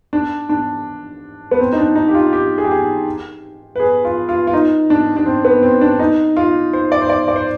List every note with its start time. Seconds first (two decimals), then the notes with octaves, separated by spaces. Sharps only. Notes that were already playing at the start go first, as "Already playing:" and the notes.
0.13 D4
0.49 D4
1.51 B3
1.59 C4
1.73 D#4
1.78 D4
1.95 D#4
2.08 G4
2.15 F4
2.33 G4
2.58 G#4
2.64 G4
2.71 G#4
3.76 B4
3.80 G#4
4.05 F4
4.29 F4
4.47 F4
4.53 D#4
4.90 D4
5.16 D4
5.26 C4
5.45 B3
5.63 C4
5.81 D4
5.99 D#4
6.37 F4
6.73 C5
6.92 D5
7.02 C5
7.10 D5
7.28 D5
7.36 C5